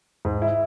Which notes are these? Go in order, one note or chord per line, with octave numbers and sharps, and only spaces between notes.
G#2
E4